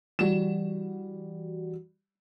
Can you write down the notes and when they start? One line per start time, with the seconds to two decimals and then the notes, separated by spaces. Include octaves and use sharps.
0.19 E3 G3 F#4 E7